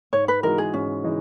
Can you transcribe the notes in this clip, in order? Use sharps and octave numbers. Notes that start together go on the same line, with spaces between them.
G#2 C#5
B4
E3 G#3 D#4 F#4 A#4
G#4
G#2 C#4
E3 G#3 D#4